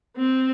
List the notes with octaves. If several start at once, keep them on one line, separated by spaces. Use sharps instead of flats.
C4